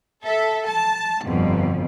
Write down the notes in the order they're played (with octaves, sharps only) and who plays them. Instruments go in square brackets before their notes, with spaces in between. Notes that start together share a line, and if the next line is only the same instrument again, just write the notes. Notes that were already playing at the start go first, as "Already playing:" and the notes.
[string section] A4 E5
A5
G1 F2 B2